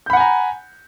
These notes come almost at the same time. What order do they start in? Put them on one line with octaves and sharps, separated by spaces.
G6 B5 F#5 G#5 A#5